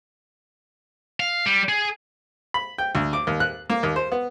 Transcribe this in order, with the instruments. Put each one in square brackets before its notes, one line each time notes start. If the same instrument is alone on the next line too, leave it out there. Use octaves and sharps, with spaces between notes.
[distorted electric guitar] F5
G3
G#4
[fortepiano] B5
G5
D2
D6
D#2
F#6
A#3
D#2
C5
B3